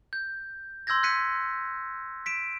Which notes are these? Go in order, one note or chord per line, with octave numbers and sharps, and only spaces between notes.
G6
C6 E6 G6 G#6 A#6
F#6 G#6 B6 C#7 D#7
B6 D7 E7